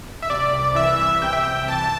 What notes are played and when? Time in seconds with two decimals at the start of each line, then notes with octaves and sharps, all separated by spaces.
0.22 E5
0.30 C3 D5
0.53 C2
0.75 E3 E5
0.99 C2
1.22 C3 G5
1.33 E5
1.43 C2 G5
1.68 E3 A5